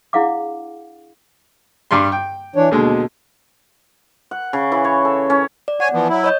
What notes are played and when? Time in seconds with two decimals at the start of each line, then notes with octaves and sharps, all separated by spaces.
0.13 D4 E4 G#4 F5 F#5 D6
1.91 G2 G3 C6
2.12 G5
2.56 E3 D4 C#5
2.71 D#2 B2 D3 G#3
4.31 F#5
4.53 C#3
4.72 E3
4.84 C#5
5.05 A4
5.30 C#4
5.68 D5
5.80 C#5 F#5 G#5
5.93 E3 F3 B3
6.09 F#3 E4
6.24 C#5 D#5 G6